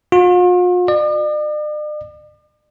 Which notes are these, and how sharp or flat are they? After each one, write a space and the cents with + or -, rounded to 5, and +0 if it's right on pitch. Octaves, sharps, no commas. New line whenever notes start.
F4 +45
D5 +45